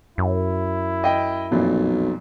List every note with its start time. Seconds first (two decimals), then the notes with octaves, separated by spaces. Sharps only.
0.18 F#2 E4
1.04 D#5 G5
1.51 B1 F2 A#2